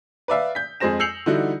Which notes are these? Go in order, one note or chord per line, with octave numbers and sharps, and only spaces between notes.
B4 D5 E5 F5
G6 B6
F2 G#3 G#4 C5 A#6 E7
E6 G6 C7 C#7 F7 F#7
D3 E3 G3 D#4 E4 F#4